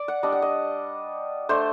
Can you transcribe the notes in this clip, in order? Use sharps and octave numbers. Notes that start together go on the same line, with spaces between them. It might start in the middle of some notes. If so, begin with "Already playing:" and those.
Already playing: D5
F#5
G3 D4 D#5
F#5
D#5
A3 D4 C5